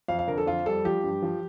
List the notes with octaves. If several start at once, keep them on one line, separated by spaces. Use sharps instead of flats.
F2 F5
F5
D3 A#4
A4
F2 F4
G3 A4
F3 G4
G2
F3